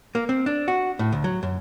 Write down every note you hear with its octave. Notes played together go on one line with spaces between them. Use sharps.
A#3
C4
D4
F#4
A2
D2
F#3
F#2